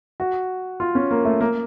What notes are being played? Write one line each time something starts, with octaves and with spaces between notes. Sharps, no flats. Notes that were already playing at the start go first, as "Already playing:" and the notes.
F#4
F4
C#4
A#3
A3
A#3